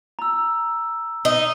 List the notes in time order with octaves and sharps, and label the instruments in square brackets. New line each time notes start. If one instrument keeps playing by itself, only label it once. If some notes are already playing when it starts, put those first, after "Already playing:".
[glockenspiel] A#5 E6
[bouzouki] D#4